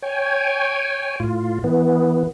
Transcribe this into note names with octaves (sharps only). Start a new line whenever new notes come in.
C#5 G5 G#5
A2 F4
E3 B3